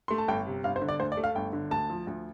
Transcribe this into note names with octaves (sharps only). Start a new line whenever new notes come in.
A3 C6
A5
G1 G5
C3
G1 F5
C5
D3
D5
D2 C5
D5
A3
F5
G1 G5
D3
D2 A5
F3
D2